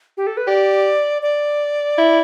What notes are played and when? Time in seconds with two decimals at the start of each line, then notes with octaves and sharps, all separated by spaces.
0.17 G4
0.27 A4
0.37 B4
0.47 G4 D5
1.22 D5
1.98 E4